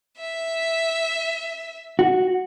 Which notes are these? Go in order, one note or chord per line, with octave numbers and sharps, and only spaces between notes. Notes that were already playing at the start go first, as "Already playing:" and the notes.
E5
F#4